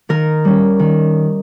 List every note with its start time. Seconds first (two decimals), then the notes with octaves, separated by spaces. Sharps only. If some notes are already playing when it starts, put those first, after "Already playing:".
0.09 D#3 A#4
0.45 G3 C#4
0.80 D#3